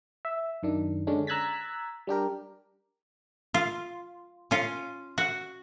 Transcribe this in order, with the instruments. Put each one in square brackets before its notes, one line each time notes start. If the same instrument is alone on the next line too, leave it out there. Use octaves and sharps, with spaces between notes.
[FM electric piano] E5
F#2 D#3 D4
D3 G#3 C#4 D4
A#5 E6 F#6 G#6 A6 B6
G3 D4 G4 A#4
[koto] F4
C#4 F4
F#4